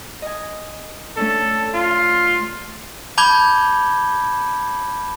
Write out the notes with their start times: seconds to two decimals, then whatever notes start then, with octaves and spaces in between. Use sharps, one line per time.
0.22 D#5 G#5
1.17 A3 C#4 D4 A4
1.75 F4
3.18 A5 B5 D6 G6 G#6 G7